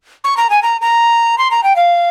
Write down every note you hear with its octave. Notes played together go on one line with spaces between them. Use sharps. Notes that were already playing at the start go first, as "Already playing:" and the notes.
C#6
A#5
G#5
A#5
A#5
C6
A#5
G5
F5